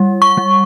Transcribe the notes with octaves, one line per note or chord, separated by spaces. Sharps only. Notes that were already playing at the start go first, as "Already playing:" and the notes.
Already playing: G3
C#6
G3